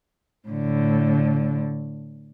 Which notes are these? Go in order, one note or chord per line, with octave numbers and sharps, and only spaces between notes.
A2 D3